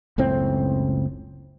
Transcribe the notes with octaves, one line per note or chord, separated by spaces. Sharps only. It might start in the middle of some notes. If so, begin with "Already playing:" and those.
F#1 C#2 A2 C4